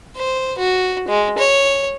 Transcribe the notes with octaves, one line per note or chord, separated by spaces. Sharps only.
C5
F#4
G#3
C#5